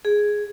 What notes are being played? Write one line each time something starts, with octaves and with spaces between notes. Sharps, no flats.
G#4